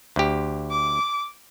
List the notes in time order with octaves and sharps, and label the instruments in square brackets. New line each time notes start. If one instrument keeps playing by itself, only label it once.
[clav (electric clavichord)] D2 G4
[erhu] D6